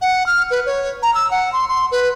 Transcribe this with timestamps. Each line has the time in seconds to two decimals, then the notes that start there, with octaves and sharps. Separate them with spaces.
0.02 F#5
0.26 F6
0.51 B4
0.66 C#5
1.03 A#5
1.15 E6
1.31 F#5
1.53 C6
1.68 C6
1.92 B4